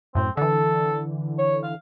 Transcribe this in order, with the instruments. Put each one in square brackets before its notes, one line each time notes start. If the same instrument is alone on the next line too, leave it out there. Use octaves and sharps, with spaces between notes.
[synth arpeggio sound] F#2 A2 [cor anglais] C4
[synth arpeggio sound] D3 E3 [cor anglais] A4
[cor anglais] C#5
F5